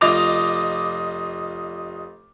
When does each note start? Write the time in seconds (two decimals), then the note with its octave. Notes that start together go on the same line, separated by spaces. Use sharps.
0.01 F1 F4 D#5 D6 F7